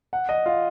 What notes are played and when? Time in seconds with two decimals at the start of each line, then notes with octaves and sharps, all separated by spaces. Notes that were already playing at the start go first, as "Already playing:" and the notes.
0.13 F#5
0.29 D#5
0.46 F4